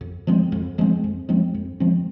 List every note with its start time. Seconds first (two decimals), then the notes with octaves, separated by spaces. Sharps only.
0.01 F2
0.27 F3 G#3 C4
0.52 F2
0.78 F3 G#3 C4
1.04 F2
1.29 F3 G#3 C4
1.54 F2
1.80 F3 G#3 C4